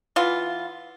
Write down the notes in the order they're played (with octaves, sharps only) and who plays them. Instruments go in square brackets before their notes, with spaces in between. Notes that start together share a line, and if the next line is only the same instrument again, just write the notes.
[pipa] E3 B3 F4